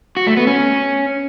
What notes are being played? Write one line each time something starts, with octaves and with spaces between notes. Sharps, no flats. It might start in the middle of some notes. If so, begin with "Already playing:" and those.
F#4
A3
B3
C#4